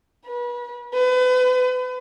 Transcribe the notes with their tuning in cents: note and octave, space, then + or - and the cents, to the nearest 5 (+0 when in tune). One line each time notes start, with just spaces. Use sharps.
B4 -35
B4 +35